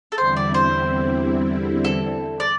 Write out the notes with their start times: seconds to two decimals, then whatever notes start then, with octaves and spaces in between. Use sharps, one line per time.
0.12 A4
0.17 E2 D3 G3 C4 E4 C5
0.36 D5
0.54 C5
1.85 A4
2.40 D5